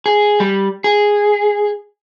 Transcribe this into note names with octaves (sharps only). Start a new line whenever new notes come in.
G#4
G3
G#4